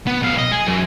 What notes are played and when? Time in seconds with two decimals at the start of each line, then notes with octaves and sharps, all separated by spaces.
0.07 B3
0.22 B1 F5
0.39 D#5
0.52 G#4
0.67 F#2